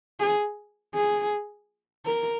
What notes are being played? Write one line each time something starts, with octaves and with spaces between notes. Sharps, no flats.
G#4
G#4
A#4